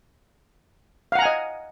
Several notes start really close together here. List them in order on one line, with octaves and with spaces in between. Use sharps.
F5 F#5 A#5 G#5 D#5